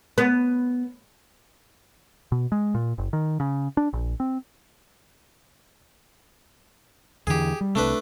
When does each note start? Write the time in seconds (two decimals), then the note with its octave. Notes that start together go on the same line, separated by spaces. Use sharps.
0.18 B3
2.32 B2
2.52 G#3
2.75 A#2
2.98 F#1
3.13 D#3
3.40 C#3
3.77 D4
3.93 A#1
4.20 C4
7.27 E2 D3 E3 G4 G#4
7.61 G3
7.75 C2 C3 A3 D4 B4